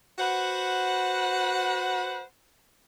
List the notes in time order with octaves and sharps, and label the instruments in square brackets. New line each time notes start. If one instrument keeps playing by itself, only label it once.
[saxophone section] F#4 B4 C5 F#5